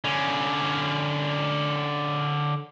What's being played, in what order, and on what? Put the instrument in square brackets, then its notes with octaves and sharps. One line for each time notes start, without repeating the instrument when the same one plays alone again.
[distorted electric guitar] D3 C#4